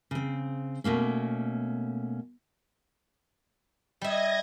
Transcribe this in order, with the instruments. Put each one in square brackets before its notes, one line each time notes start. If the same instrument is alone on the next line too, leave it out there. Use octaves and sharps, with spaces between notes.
[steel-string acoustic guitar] C#3 C4
B2 A3 A#3 C#4
[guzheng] G3 E5 [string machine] D#5 G#6 A#6